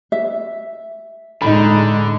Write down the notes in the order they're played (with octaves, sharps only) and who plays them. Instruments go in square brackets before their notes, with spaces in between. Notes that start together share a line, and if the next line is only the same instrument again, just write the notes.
[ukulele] E5
[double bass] A2 G#3 [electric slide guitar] D3 [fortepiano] D#4 B5